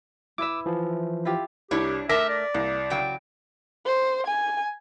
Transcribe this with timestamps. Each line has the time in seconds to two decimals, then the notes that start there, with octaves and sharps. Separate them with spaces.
0.38 E4 B4 E5 D6 E6
0.66 E3 F3
1.25 E4 F4 G4
1.71 C2 D4 E4 G4 C#5
2.09 A3 A#4 E5 A5 D6 A#6 B6
2.29 D5
2.54 C2 A#3
2.90 C#3 F#3 G5
3.86 C5
4.26 G#5